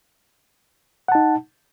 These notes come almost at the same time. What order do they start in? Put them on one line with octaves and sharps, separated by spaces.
F#5 A5 D#4